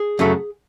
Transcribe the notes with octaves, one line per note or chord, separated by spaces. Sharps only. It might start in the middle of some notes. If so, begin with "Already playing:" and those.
Already playing: G#4
F#2 C#3 F#3 A3